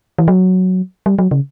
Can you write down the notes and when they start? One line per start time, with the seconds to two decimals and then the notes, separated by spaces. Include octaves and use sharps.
0.18 E3
0.28 F#3
1.06 G3
1.19 F#3
1.31 C#3